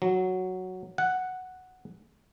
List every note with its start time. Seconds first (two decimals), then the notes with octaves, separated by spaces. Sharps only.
0.02 F#3
0.98 F#5